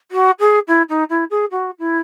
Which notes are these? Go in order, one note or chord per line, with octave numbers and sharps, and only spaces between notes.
F#4
G#4
E4
D#4
E4
G#4
F#4
E4